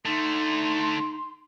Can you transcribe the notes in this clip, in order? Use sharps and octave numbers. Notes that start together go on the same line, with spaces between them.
D3 A3 D#4 C6